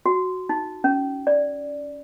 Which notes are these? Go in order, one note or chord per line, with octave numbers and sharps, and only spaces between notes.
F#4
D#4
C#4
D5